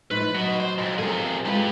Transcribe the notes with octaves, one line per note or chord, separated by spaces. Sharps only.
A2 F3 D#4 B4
F#3 D#5 F#5
C5
F2 G#2
C3 F3 A#3 G#4 A4
G#3 F4 G4 B4